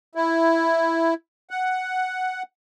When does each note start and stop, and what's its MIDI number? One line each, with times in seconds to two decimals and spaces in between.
0.15 1.14 64
1.50 2.43 78